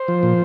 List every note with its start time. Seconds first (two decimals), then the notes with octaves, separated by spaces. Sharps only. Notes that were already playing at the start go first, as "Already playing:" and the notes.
Already playing: C5
0.08 F3
0.23 A#2